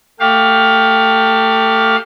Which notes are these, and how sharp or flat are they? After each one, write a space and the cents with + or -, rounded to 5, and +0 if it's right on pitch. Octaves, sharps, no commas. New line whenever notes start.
A3 +25 G4 +0 F5 +10